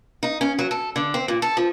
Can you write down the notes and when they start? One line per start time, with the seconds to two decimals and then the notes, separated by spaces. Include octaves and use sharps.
0.23 D#4
0.41 C#4
0.59 F#3
0.71 A4
0.96 D3
1.14 C4
1.28 A#2
1.42 A4
1.57 F3